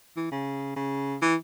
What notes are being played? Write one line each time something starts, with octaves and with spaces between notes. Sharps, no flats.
E3
C#3
C#3
E3